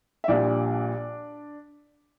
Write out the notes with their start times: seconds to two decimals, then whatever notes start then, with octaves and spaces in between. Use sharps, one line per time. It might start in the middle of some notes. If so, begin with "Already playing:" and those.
0.24 E5
0.28 A#1 A#2 G3 D4 D5